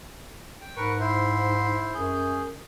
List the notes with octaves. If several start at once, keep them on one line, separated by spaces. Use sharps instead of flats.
G5
G#2 A#4 B4 C#6
E4 C5
F#2 G#4 G6